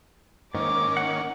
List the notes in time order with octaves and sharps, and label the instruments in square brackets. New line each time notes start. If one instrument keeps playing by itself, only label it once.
[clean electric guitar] G#2 [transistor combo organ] D#3 A#3 C#4 [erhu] D6
[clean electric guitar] F#5